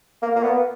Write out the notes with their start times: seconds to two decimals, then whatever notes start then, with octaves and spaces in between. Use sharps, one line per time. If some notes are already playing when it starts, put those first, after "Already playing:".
0.22 A#3
0.36 A#3
0.43 B3